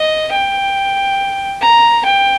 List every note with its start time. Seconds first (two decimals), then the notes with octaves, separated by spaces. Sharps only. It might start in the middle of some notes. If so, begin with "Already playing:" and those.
Already playing: D#5
0.32 G5
1.61 A#5
2.05 G5